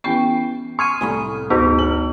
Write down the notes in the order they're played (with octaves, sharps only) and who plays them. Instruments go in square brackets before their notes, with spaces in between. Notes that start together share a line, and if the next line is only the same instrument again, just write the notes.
[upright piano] E3 G5 C7 [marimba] B3 C#4 G4
[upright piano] C6 C#6 F6 [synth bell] D#6 G#6 D#7
[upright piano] C2 A2 [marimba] G#5 B5 C#6
[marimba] D2 G2 D6 [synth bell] B3 D#4 F#4
[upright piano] B1 F#7 [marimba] F6